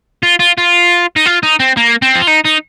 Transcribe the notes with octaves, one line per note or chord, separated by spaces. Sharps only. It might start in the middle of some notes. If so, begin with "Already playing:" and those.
F4
F4
F4
D#4
F4
D#4
C4
A#3
C4
F4
D#4
D#4